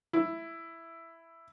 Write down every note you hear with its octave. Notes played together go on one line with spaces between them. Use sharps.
E4